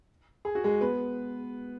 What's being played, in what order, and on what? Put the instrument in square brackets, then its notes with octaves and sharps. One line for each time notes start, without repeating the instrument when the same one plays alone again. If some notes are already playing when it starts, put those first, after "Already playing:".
[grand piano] G#4
F#4
G#3 G#4
B3 B4